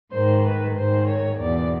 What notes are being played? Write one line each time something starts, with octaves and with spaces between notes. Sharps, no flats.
G#2 D#3 C5
B4
G#2 D#3 C5
C#5
E2 B2 D5